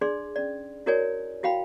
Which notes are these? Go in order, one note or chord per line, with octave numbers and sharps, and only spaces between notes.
D4 G#4 D5 C6
C#4 D5
E4 F#4 A#4 C#5 D5 G#5
E4 F#4 F5 G5 B5